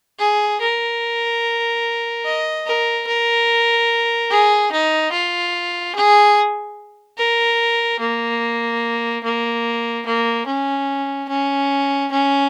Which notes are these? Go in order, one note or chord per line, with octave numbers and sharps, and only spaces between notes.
G#4
A#4
D#5
A#4
A#4
G#4
D#4
F4
G#4
A#4
A#3
A#3
A#3
C#4
C#4
C#4